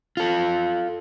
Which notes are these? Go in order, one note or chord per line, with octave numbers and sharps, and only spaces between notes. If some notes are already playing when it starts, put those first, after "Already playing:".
F4 A4